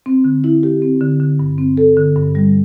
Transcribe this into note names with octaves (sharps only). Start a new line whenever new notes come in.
C4
D3
E4
G4
C4
D3
D3
G2
C4
A4
D3
G2
G3